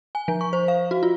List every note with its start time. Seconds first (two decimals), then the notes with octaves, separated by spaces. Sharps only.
0.15 G#5
0.28 F3
0.41 C#6
0.53 C5
0.68 F5
0.91 F#4
1.03 F4